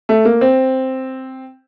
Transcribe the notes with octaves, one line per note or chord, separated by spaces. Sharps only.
A3
A#3
C4